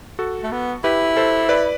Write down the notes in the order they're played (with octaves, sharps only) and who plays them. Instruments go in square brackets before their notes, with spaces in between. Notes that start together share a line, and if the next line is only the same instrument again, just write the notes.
[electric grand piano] F#4 A4
[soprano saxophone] A3
B3
[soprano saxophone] E4 [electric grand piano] G4 B4
[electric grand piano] A4 C5
B4 D5